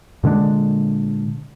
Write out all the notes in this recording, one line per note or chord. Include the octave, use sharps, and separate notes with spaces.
A#2 D3 G#3 D4